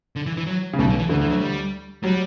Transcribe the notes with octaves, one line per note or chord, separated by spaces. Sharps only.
D3
E3
E3
F#3
C#3
B1 B2 G3
D3
E3
D2 D3 E3
E3
F#3
G3
F#3 G3